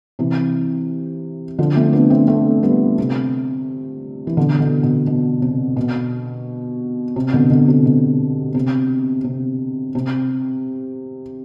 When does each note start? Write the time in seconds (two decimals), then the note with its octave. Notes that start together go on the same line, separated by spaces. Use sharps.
0.19 C3 E3
1.59 D3 F3
1.76 A3 C4
1.93 B3 D4
2.10 A3 C4
2.28 A3 C4
2.63 G3 B3
2.98 C3
4.27 E3
4.37 B2 D3
4.60 B2 D3
4.83 B2
5.07 B2
5.42 C3
5.76 B2
7.16 C3
7.33 B2 D3
7.50 B2 D3
7.68 C3
7.86 B2
8.55 C3
9.24 C3
9.95 C3